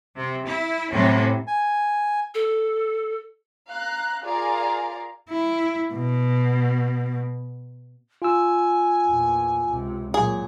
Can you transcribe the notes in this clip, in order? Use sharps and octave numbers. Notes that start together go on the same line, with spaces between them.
C3
E4
A2 C3 F#3 C#4
G#5
A4
F5 A#5 F#6
F4 G#4 A#4 D5 F5 A#5
E4
B2
F4 G#5 E6
E2 A#2
C#2 C3
A#2 F#3 G#4